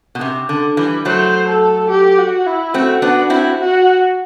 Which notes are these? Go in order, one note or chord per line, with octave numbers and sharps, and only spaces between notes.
B2
C3
D3
E3 G3
F#3 A3 C5
A4
G4
F#4
E4
A3 C4 F#4
B3 D4
C4 E4
F#4